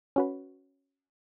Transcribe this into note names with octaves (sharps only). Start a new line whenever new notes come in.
C#4 F#4 B4